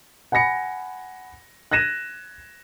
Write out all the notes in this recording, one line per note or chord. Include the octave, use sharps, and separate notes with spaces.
F#5 G#5 B5 A#6 C#7
F#6 G#6 A#6 D#7 E7